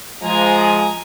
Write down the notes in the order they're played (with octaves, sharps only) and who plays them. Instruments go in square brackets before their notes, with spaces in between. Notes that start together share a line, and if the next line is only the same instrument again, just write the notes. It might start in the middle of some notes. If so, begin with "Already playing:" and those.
[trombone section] F3 G#3 [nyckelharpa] G#5 A#5